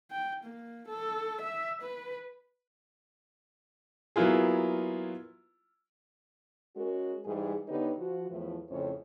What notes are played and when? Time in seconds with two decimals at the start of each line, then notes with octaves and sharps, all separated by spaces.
0.11 G5
0.44 A#3
0.88 A4
1.41 E5
1.82 B4
4.16 F#3 A#3 B3 E4 F4 G#4
6.77 G#3 C#4 F#4 A#4
7.25 G#2 E3 G3 G#4
7.68 D3 B3 D#4 G4 B4 C#5
7.98 F3 F#4
8.30 E2 A2 E3 F3
8.71 F2 A2 C#3 C#4 C5 C#5